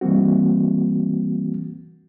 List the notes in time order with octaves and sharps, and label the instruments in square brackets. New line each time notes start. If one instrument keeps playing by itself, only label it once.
[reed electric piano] E3 G3 A#3 C4 F#4